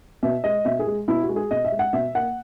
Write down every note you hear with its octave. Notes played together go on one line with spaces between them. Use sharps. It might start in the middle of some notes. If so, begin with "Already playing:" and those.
B2 E5
G#3 D#5
B2 E5
G#4
G#3
B2 E4
F#4
G#3
G#4
B2 D#5
E5
G#3
F#5
B2 E5
A#3 F#5